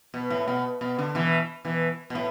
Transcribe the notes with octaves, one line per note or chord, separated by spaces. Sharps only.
B2
A2
B2
B2
D3
B2 E3
B2 E3
B2
A2